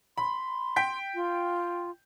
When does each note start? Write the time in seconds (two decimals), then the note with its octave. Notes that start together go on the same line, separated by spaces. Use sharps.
0.18 B5 C6
0.76 G5 B6
1.15 F4